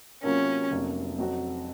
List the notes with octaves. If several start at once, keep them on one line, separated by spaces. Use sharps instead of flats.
C3 F#3 A#3 C#4 F4 A#4
F1 F2 C3 F#3 A#3
F2 C3 F#3 C4 F#4